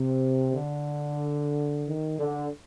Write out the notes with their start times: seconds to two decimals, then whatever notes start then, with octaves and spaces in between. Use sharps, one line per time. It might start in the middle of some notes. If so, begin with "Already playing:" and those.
Already playing: C3
0.53 D3
1.86 D#3
2.18 D3